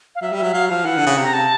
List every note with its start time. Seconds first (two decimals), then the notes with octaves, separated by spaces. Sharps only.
0.15 F5
0.22 F#3 E5
0.32 G3
0.38 F#3 E5
0.54 F#3 F5
0.69 F3 F5
0.85 E3 F#5
0.97 D3
1.06 C#3
1.17 C3
1.23 A#5
1.33 A5